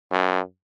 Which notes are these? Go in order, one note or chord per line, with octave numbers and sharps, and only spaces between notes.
F#2